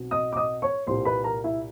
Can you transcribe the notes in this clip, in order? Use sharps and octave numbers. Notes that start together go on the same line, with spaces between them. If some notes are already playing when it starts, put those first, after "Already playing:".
Already playing: B1 B2 C4
D#5 D#6
D6
D#5 D#6
C#5 C#6
C2 A#2 G3 C5 C6
B4 B5
A#4 A#5
E4 E5